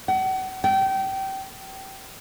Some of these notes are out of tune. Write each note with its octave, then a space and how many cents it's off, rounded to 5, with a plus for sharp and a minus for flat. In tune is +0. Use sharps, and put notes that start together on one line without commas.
F#5 +35
G5 -25